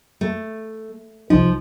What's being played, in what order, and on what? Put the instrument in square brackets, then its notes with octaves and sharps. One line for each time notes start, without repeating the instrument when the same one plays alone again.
[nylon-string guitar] A3
[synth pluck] C2 D#4 [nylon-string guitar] F3